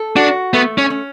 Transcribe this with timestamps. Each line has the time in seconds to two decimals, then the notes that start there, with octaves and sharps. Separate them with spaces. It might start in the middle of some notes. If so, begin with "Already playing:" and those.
Already playing: A4
0.16 D4 F#4
0.54 A3 B3
0.78 C#4
0.90 C#4